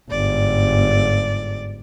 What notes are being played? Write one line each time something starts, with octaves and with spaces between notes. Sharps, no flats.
G1 G#2 D5